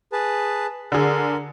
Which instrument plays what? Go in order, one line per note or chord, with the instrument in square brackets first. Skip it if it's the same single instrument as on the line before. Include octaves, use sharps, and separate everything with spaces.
[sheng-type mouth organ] G#4 B4 A5
[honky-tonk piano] D3 G#4 [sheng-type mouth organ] A#4